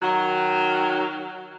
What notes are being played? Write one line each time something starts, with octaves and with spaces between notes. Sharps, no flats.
D#3 F#3